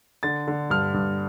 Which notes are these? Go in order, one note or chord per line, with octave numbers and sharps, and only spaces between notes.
D3 A6
D3
G2 F6
G2